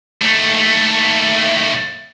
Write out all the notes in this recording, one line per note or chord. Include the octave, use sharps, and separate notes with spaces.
D#2 A3